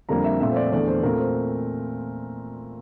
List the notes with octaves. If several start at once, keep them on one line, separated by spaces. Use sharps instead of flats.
F2 D3 G3 A#3 A#5
E5
A#2 F3 A3 C4 E5
C5
D5
E2 D3 A3 D5
C5
A#2 A3 C4 A#4
C5